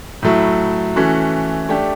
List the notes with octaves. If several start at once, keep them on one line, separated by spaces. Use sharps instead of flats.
A2 F#3 A3 E4
E3 A3 C#4 F#4
A3 D4 G4